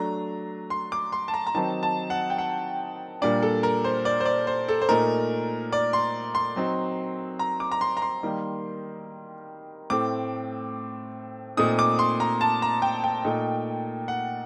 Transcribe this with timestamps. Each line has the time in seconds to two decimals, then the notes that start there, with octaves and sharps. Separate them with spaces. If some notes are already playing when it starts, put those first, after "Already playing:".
Already playing: F#3 A3 D4 A#5
0.70 C6
0.92 D6
1.12 C6
1.28 A5
1.34 A#5
1.47 A#5
1.55 D#3 F#3 C4 D#4 A5
1.83 A5
2.10 F#5
2.30 G5
2.38 F#5
3.22 A#2 G3 A#3 D4 D5
3.42 A4
3.63 A#4
3.84 C5
4.05 D5
4.20 C5
4.26 D5
4.47 C5
4.68 A4
4.82 C5
4.89 A#2 A3 D#4 A#4
5.73 D5
5.93 C6
6.35 C6
6.56 F#3 C4 D#4
7.39 A#5
7.60 D6
7.72 A#5
7.81 C6
7.97 A#5
8.02 C6
8.23 D#3 G3 A#3
9.90 A2 A3 C4 D6
11.57 A#2 A3 C4 D#4 D#6
11.79 D6
11.99 C6
12.20 A#5
12.41 A5
12.62 A#5
12.82 G5
13.04 G5
13.25 A#2 A3 D#4
14.08 F#5